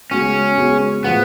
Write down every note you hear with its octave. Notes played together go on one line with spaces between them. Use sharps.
C#3 G#3 B3 C#4 F#4
C#3 G#3 B3 F#4
A2 F3 A3 B3 F4 G#4